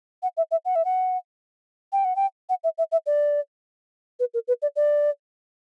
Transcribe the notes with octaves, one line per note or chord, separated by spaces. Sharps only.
F#5
E5
E5
F#5
E5
F#5
G5
F#5
G5
F#5
E5
E5
E5
D5
B4
A#4
B4
D5
D5